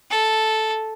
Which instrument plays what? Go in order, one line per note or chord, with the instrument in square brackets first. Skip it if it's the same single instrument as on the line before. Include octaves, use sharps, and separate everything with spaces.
[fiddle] A4